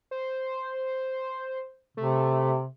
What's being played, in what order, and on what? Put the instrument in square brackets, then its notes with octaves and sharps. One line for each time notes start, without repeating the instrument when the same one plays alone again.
[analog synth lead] C5
[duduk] C3 [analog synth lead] A3